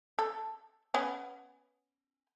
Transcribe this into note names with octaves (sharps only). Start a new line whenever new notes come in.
A4
B3 C#4